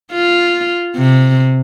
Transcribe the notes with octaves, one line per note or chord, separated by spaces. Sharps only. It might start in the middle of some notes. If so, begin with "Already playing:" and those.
F4
C3